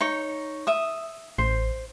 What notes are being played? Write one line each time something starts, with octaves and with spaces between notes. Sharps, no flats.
D#4 C#5
E5 D#6
A1 C5